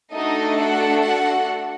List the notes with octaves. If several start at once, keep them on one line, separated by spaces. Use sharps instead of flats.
A3 D4 D#4 F#4 A4 D#5
F#4 F#5
F#4 F#5